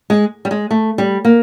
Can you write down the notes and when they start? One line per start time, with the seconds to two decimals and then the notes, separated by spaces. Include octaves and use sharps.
0.10 G#3
0.45 G3
0.51 G#3
0.71 A3
0.98 G3
1.25 A#3